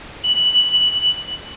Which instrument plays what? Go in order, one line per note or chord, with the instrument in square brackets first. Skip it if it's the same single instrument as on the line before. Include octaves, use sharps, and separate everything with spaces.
[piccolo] F#7